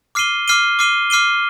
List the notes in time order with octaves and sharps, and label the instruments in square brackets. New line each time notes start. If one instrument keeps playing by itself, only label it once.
[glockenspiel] D6 F6 C7 D#7 G7
D6 F6 C7 D#7 G7
D6 F6 C7 D#7 G7
D6 F6 C7 D#7 G7